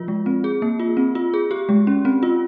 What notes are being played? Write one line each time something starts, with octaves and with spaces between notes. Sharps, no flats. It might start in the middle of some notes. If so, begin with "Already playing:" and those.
Already playing: F3 F4
G#3
C4
G#4
A#3
F4
C4
F4
G#4
G4
G#3
C#4
C4
F4